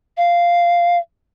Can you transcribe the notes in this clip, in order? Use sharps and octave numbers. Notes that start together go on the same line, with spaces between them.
F5